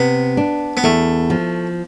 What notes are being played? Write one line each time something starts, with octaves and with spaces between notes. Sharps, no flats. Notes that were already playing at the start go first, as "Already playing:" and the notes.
Already playing: C3 B3
D4
B3
E2 A3
F3